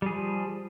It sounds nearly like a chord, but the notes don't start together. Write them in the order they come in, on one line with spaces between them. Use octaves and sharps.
G3 G#4 F3